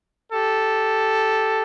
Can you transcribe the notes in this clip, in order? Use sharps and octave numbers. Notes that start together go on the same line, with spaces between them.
G4 A4